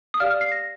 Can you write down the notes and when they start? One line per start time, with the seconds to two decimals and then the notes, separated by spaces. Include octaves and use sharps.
0.14 D#6
0.20 G4 D5 F5 F6
0.31 F6
0.41 C7
0.52 A#6